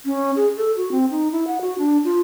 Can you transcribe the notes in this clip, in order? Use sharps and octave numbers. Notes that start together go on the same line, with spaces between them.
C#4
G#4
A4
F#4
C4
D#4
E4
F#5
F#4
D4
F4